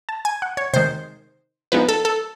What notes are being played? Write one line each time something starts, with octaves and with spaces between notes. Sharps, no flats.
A5
G#5
F#5
C#5
C3 D#3 G#3 C5
F3 G#3 B3 D#4 B4
A4
A4